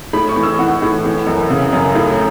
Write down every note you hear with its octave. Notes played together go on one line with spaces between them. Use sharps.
A2 B5
C#6
E3
E6
E3 F#5
A2
E3
F#2
C#3
F#2
A2